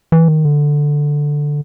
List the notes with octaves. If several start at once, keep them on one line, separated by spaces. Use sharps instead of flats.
E3
D#3
D3